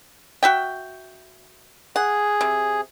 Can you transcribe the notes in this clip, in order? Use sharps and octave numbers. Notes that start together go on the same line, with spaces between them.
F#4 E5 G5
G#4 F#5
C3